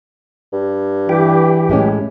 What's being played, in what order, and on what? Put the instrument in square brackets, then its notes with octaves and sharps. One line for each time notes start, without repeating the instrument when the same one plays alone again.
[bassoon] G2
[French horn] E3 [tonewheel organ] G4
[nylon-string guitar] A2 G#3 C#4